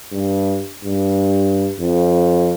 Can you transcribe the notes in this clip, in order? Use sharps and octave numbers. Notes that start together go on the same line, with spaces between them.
G2
G2
F2